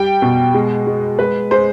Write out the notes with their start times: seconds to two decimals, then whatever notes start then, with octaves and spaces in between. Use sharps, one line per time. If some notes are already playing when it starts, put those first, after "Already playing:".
Already playing: G3 G5
0.22 B2
0.54 G#3
0.87 G#3
1.19 G#3 B4
1.51 G#3 C5